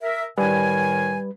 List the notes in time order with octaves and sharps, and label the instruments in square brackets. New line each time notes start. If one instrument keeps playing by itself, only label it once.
[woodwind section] A#4 E5
[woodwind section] A2 D#3 G#5 [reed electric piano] G3 B4